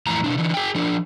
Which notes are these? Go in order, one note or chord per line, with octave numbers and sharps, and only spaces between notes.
F2 A2 E3 A#5
B2 D#3 D4
D3 E3
G#4 G5
F3 D4